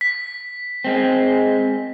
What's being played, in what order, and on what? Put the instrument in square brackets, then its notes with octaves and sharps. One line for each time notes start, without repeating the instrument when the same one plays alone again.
[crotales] B6
[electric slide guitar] G#3 C4